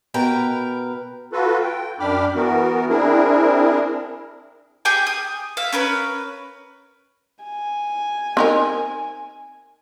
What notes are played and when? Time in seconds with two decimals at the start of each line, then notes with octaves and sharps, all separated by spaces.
0.14 B2 A#4 B4 G5 A#5
1.33 F4 F#4 A4 B4
1.63 G5
2.00 F#2 D4 G5 B5 D6 F6
2.35 E3 B3 F#4 A#4
2.89 C4 D4 E4 G#4 A#4
4.85 G4 G#4 G5 G#5
5.07 D#6
5.57 E5 F5
5.72 C#4 A#4 B4
7.44 G#5
8.37 C4 D#4 A#4